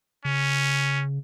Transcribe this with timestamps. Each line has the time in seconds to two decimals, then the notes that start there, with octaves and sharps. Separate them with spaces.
0.25 C#3 C#4